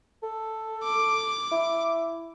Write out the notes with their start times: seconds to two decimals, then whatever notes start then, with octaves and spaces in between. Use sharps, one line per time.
0.23 A4
0.84 D6
1.52 E4